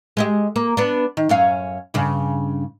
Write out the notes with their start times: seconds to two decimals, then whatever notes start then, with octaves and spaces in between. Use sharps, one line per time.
0.17 G#3 G4 D#5
0.56 A#3
0.77 B3 D4
1.17 D#3
1.29 F#2 C#4 F5
1.94 G2 C#3